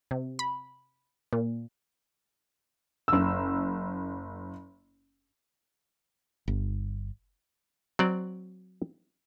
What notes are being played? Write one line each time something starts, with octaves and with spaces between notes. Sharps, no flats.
C3
B5
A#2
F#1 E6
G1
F#3 C4 D5